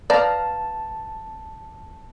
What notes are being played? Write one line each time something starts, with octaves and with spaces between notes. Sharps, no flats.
B4 D5 F5 A5 A#5